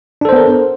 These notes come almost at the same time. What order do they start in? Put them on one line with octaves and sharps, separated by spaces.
D4 A4 C5 B3 A#4